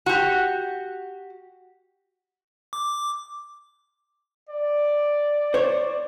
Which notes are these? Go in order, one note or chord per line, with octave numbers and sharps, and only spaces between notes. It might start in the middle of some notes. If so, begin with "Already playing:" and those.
F#4 G4
D6
D5
C5 C#5